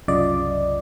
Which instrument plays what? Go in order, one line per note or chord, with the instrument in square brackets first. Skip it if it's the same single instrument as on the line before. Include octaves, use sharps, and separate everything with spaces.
[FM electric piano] C2 F#2 C#3 F4 D5 D#5